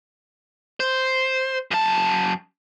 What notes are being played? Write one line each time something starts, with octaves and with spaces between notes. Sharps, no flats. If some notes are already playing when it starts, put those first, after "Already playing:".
C5
F#2 A5